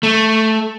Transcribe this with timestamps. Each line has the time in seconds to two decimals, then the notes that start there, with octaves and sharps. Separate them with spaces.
0.03 A3